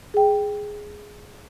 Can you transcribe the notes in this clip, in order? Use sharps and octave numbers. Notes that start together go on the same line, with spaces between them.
G#4 G5